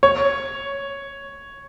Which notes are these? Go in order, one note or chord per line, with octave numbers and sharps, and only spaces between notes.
C#5